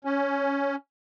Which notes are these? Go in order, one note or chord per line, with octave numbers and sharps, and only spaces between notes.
C#4